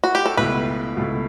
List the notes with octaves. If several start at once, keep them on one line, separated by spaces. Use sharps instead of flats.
F#4
G4
A4
C#2 B2 A3 E4 B4
C#2 B2 A3 E4